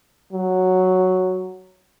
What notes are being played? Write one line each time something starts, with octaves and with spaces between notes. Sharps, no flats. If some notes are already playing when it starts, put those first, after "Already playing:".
F#3